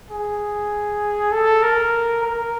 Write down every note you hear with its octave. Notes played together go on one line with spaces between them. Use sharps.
G#4
A4
A#4
A#4